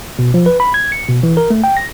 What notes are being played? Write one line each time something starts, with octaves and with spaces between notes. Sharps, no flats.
B2
F3
B4
B5
G#6
C#7
B2
E3
A#4
A3
G5
A#6